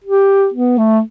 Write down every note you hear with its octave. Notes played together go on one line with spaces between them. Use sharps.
G4
B3
A3